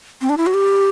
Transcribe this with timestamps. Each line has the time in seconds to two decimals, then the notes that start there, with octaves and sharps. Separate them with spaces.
0.22 C4
0.29 D4
0.37 E4
0.46 F#4
0.54 G4